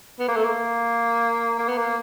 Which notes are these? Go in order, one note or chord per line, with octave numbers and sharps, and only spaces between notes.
B3
A#3
A3
A#3
A#3
B3
A#3